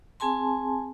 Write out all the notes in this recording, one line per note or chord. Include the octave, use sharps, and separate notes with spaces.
C4 G#4 G#5 A5 C6